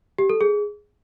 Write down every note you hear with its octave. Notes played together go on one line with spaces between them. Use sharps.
G4
A4
G#4